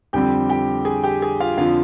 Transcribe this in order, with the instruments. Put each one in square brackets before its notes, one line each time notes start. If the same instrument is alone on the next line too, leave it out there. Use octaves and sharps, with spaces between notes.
[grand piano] F2 D3 G3 C4 G4 G5
G4 G5
G#4 G#5
G4 G5
G#4 G#5
F4 F5
F2 D3 F3 F4 F5